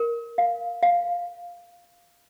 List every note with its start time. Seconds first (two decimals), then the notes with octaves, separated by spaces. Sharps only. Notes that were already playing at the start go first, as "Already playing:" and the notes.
Already playing: A#4
0.38 F5
0.83 F5